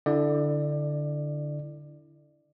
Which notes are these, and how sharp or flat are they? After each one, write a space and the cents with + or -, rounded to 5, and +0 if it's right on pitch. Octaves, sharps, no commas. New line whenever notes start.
D3 +0 E4 +0 D5 +25